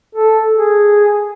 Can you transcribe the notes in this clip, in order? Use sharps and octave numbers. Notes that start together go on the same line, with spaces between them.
A4
G#4